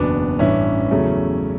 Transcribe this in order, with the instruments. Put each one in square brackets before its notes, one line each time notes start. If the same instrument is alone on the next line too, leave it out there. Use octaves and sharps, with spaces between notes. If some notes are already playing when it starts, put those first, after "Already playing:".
Already playing: [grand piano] F#1 E2 B2 B3 D4
A1 G2 E3 C#4 E4
E2 C#3 F#3 A3